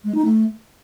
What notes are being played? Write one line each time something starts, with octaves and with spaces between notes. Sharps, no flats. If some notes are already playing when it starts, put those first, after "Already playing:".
G#3
D#4
A3